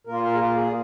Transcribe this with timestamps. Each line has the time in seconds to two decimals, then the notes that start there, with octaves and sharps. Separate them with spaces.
0.07 A#2 A#3 F4 A#4
0.24 A#4
0.35 G#4
0.39 F4
0.55 G#4